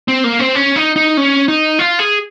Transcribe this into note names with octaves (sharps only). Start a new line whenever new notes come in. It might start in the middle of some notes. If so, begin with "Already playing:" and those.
C4
A#3
C4
C#4
D#4
D#4
C#4
D#4
F4
G#4